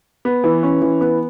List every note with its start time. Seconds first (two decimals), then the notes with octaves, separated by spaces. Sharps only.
0.25 B3
0.44 E3
0.63 C#4
0.82 E3
1.01 B3